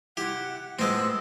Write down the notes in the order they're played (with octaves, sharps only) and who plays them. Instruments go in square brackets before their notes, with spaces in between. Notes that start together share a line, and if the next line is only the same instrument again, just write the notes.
[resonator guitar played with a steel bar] C3 E4 [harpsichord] G4 [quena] F#5
[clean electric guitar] A2 [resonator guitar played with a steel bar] F3 B3 B4 [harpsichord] G#3 C4 [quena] E6